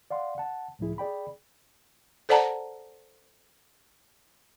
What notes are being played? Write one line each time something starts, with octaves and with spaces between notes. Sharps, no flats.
D5 F5 F#5 C6
F#5 A5
C#2 A2 F3 E4 G#4
G#4 D5 G5 B5
A4 C5 D5 F#5 A5 A#5